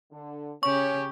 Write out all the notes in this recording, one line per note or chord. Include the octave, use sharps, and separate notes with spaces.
D3
C#3 C#4 G4 C#5 C#6